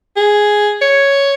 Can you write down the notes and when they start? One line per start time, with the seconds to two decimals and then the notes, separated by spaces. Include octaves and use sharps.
0.17 G#4
0.82 C#5